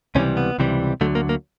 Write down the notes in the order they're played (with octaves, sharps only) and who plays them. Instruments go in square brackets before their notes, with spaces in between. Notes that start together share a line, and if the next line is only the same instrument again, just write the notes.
[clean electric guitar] C#2 C3 E3 G3 C#4
B3
C#2 C3 E3 G3
D2 D3 F#3 A3
A#3
A#3